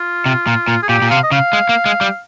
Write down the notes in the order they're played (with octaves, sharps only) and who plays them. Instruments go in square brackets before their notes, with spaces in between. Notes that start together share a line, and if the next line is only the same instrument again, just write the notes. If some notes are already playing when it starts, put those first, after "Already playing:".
Already playing: [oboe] F4
[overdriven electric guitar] C3
A#2
A#2
[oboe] G#4
[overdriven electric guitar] A#2 [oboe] G4
[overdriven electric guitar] A#2
[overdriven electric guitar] C3 [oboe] F5
[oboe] D#5
[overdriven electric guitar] C#3 [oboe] F5
[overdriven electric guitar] G#3
A#3
G#3
G3